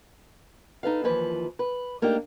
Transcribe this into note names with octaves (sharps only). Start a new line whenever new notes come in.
D#4 A4 B4 F5
D#2 E3 F3 B4
B4
A3 A#3 D4 D#4 G4